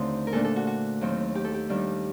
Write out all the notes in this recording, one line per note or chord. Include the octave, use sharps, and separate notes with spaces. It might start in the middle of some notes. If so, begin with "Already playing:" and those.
Already playing: D#2 D3 A3 C4 D#4 C5
A#4
A#2 A3 D4 A4
A4
F#4
F#4
D#2 D#3 F#3 C4
G4
A4
G4
D#2 D#3 G3 D4